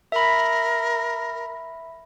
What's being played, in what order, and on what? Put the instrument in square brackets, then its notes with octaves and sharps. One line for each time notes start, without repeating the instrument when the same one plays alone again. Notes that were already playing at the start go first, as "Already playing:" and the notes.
[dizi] A#4 [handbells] E5 B5